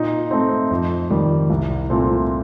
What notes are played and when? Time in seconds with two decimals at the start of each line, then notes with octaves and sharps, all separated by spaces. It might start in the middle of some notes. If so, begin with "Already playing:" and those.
Already playing: A#2 D#4
0.31 A3 C4
0.71 F2
1.10 D#3 G3
1.50 C2
1.90 A#2 A3 C4